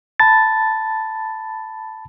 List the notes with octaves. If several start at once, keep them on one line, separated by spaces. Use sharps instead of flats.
A5 B5 A6